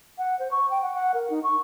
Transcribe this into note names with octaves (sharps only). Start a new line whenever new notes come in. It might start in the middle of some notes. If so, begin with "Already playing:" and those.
F#5
C5
C#6
G5
F#5
F#5
A#4
D#4
C#6